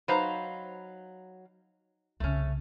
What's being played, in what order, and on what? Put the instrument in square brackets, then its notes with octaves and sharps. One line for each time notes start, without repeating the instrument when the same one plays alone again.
[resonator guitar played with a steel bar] F#3 F5 A#5 [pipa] D#4 B4 C5
[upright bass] C2 C#3 [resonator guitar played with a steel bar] A3 C#4